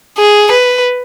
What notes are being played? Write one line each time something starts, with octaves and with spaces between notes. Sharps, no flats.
G#4
B4